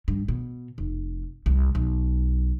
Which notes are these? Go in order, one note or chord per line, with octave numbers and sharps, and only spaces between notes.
G2
B2
F1
C2
B1